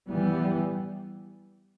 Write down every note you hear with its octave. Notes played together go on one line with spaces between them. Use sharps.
E3 G3 B3